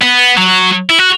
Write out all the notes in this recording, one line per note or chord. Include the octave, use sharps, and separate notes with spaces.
B3
F#3
E4
F#4